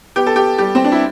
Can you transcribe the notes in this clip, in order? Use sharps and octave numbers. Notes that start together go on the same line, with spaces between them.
B3 G4
A4
G4
G3 G4
C4
D4
E4